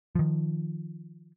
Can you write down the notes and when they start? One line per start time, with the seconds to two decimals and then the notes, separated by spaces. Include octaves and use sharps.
0.15 D#3 F3